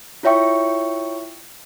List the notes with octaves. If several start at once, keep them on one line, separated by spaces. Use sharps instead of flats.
E4 F4 C#5 E5 G5 C#6